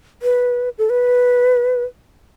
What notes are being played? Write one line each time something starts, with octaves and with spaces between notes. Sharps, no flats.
B4
A4
B4